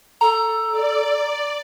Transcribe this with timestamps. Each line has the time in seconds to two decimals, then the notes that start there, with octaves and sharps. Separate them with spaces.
0.21 A4 A#5
0.71 D5